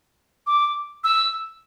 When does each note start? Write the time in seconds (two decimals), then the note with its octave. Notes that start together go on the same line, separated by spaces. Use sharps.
0.47 D6
1.04 E6